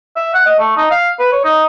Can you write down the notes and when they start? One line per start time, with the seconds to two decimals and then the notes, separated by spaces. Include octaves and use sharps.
0.16 E5
0.34 F#5
0.46 D#5
0.59 A3
0.77 D#4
0.91 F5
1.19 B4
1.32 C#5
1.44 D#4